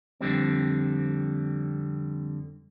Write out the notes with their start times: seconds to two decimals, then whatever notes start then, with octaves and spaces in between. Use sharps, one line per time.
0.21 F2 D3 G3 C4